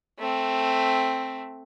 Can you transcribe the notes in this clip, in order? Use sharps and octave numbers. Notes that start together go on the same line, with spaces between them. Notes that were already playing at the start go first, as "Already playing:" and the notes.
A3 C4